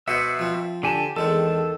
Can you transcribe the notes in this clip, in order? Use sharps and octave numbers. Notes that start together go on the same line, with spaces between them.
B2 C5 D#5 E5 F#5
F3 C4
D3 G4 G#5 A5
E2 D#3 G#3 C4 A4